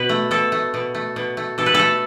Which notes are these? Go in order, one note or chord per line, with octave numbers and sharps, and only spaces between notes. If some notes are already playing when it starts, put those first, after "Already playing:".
Already playing: B2 B4
A3
B2 A4
A3
B2
A3
B2
A3
B2 A4
B4
A3 A4